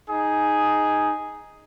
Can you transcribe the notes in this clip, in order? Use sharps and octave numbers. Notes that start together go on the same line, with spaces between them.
D#4 G#4